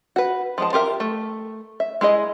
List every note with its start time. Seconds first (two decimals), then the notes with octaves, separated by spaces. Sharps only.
0.16 F#4 B4
0.58 F3 G#3 A5
0.73 F4 G4 A#4 E5
1.00 A3
1.80 E5
2.01 G#3 E4 G#4 D#5